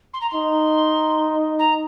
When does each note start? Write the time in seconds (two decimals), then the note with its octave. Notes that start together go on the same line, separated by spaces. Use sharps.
0.14 C6
0.21 A#5
0.30 D#4 C6
1.59 A#5